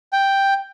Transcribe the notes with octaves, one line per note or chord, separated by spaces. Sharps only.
G5